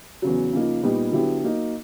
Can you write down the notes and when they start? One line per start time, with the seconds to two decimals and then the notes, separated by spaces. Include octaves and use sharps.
0.22 E2 C#3 F#3
0.53 C#3 F3 A#3 D#4
0.83 A#2 G3 B3 D#4
1.12 D3 F#3 B3 E4 G4
1.42 F#3 A#3 D#4